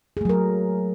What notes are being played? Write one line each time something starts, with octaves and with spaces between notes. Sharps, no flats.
F#3 A3 G#4 A#4